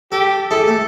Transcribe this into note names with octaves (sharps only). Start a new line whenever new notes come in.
G4 A4
E4 G#4 A4
A3